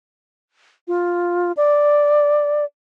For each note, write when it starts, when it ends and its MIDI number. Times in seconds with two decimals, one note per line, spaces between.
0.88 1.52 65
1.57 2.65 74